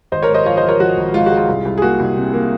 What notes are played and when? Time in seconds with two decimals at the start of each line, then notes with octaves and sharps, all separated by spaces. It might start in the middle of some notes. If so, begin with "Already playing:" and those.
0.12 G#1 C5 D#5
0.23 A#4 C#5
0.29 G#2
0.34 C5 D#5
0.45 F3 C#5 F5
0.57 C5 D#5
0.63 F3
0.69 A#4 C#5
0.79 F3 F#4
0.97 G#1
1.14 G#2 F4
1.26 G#3 F#4
1.37 F4
1.49 C2
1.65 C2
1.78 G#4
1.82 A#3 F#4
2.00 C2
2.16 C3
2.34 A#3